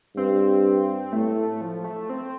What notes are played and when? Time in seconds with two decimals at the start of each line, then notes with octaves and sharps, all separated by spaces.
0.16 G2 C4
1.13 A2 A3
1.61 F3
1.84 A3
2.10 C4